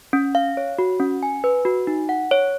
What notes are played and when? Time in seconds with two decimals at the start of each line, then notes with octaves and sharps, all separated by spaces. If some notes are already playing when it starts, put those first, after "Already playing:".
0.13 C#4
0.35 F5
0.57 C#5
0.79 F#4
1.00 C#4
1.23 G#5
1.44 B4
1.65 F#4
1.87 D#4
2.09 F#5
2.31 C#5